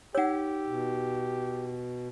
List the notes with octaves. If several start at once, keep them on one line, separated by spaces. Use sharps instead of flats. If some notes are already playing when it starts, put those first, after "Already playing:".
D#4 G4 C#5 F#5 E6
B2